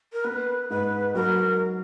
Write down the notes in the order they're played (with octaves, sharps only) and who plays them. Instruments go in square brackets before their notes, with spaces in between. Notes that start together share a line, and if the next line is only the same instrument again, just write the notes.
[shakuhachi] A#4
[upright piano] B3 [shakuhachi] B4
[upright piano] G#2 [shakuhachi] B4
[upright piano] F#3 [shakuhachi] A#4